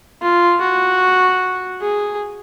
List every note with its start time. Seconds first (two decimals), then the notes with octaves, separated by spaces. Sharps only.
0.22 F4
0.61 F#4
1.81 G#4